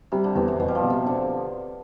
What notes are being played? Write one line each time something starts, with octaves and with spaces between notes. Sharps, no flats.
C3 G3
D3
E2 C3
C3
E2 B2
G3
F3
B2
C3
D3 C4